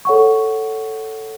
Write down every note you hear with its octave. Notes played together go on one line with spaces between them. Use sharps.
A4 C#5 F#5 C#6